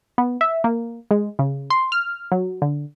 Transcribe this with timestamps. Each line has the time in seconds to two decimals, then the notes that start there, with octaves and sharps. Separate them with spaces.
0.18 B3
0.41 E5
0.64 A#3
1.11 G#3
1.39 C#3
1.70 C6
1.92 F6
2.32 F#3
2.62 D3